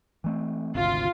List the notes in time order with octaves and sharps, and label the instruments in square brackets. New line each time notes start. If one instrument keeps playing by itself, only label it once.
[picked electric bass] E3 A3 C4
[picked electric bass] G#1 D2 C3 [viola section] F4